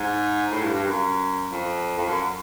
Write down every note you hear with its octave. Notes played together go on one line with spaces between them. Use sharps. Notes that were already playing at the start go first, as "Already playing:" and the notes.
Already playing: G#2
A2
G2
G2
F#2
F2
F2
F#2